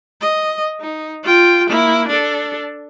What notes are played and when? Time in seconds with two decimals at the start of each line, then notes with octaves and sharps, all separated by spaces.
0.21 D#5
0.81 D#4
1.24 F4 G5
1.69 A#3 E4
2.08 D4 A4